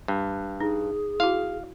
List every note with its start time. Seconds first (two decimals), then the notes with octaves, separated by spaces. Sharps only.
0.08 G2
0.60 D#4 G#4
1.20 E4 F#4 F5